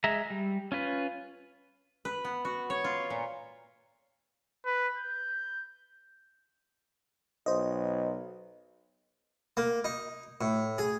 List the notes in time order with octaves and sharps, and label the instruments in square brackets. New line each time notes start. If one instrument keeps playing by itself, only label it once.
[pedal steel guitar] G#3 E5 A#5
G3
C#4 F4 B4
[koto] B4
B3
F#4
C#5
F4
A#2
[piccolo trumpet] B4
G6
[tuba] B1 [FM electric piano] C5 D#5
[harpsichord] A#3
D#4
A2
G#4